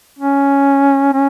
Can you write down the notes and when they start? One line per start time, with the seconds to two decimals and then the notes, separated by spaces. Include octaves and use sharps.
0.18 C#4
1.13 C#4